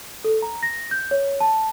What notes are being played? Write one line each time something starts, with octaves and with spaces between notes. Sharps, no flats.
A4
A#5
A#6
G6
C#5
A5